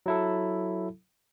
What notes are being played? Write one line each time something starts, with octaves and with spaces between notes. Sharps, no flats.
F#3 E4 A4